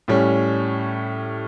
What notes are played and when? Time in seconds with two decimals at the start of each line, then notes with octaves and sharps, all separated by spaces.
0.08 A2 G3 C#4